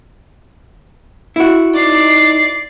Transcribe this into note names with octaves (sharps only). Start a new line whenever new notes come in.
E4 F#4
D#4 D5 C7